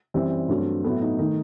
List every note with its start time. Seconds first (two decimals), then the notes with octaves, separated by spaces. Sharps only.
0.14 F#2 E3 G3 C4
0.49 G2 F#3 A3
0.84 A2 F#3 A3 B3
1.01 D#4
1.19 D#3 A3 D#4